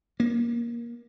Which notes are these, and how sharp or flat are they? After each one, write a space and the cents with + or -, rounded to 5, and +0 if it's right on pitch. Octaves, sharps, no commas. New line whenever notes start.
A#3 +20